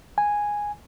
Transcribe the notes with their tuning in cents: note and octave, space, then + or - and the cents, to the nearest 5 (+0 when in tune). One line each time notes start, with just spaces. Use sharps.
G#5 -5